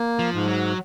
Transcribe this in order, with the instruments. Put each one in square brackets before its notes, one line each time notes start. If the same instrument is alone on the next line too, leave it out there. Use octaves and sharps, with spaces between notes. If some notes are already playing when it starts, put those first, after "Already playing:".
Already playing: [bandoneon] A#3
[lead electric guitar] F3
[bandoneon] G#2
[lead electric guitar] F#3